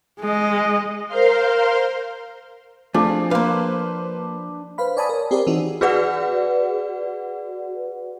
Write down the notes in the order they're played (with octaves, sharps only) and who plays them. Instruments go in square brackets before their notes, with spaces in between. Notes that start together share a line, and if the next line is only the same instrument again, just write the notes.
[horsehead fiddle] G#3 D#5
[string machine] A#4 C5 F5 C6
[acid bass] F3 [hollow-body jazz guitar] A3 [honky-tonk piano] C4 F4 G#4 [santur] D4
[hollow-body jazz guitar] A#3 F5 [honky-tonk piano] B4 C5
[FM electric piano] B4 C5 F5 B5
C#5 D5 G#5 A5 B5 D#6
A#4 C#5
C4 G4 G#4 A#4 C5 D5
E3 C4 D#4 F#4
[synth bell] F#4 G#4 B4 D5 F#5